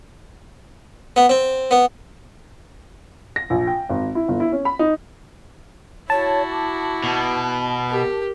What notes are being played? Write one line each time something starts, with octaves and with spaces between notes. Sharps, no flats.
B3
C4
B3
A#6
A#1
G5
G#1
E4
G1
E4
C#4
B5
D#4
E4 F#4 C#5 A5
D6
B2
G4 A#4